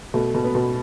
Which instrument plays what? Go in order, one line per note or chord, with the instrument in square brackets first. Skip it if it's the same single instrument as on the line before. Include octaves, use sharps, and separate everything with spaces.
[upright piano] B2 A3
B2
B3
B2